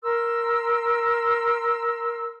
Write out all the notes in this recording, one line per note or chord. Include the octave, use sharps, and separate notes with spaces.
A#4 C6 E6